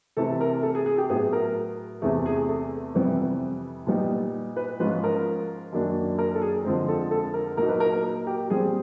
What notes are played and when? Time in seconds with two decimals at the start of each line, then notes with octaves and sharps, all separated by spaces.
0.17 C3 E3 A3 A4
0.40 A#4
0.63 A4
0.75 G#4
0.86 G#4
0.98 G4
1.09 A2 F#3 B3 E4 G#4
1.33 A#4
2.02 E2 C3 E3 A3 G#4
2.26 G#4
2.49 A4
2.94 F2 C3 E3 G3 B3
3.87 A#2 G3 B3 D#4
4.57 B4
4.80 G#2 F3 G#3 C#4 F4 B4
5.04 A#4
5.72 F#2 D#3 F#3 A#3 D4
6.18 A#4
6.35 A4
6.42 G#4
6.65 F2 D3 F3 G#3 C4
6.88 A4
7.11 A4
7.34 A#4
7.57 A#2 F#3 A#3 D#4 A#4
7.69 B4
7.80 A#4
8.03 A#4
8.27 G4
8.50 A#2 G3 C4 G#4